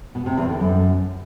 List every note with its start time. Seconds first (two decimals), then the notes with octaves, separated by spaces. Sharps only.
0.15 B2
0.26 C3
0.37 E2
0.49 D3
0.60 F#2